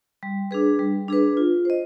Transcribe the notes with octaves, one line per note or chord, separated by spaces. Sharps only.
G3
D4 G#4 B4
G3
D4 G#4 B4
F4
C5 D#5